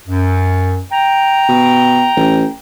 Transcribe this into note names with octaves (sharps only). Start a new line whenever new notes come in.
F#2
G5 A#5
B2
A1